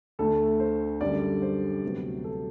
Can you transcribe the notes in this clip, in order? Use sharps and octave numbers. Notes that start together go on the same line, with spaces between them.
D2 D3 A3 A4
C5
F#2 D3 G3 D5
C5
D2 C3 F#3 B3
A4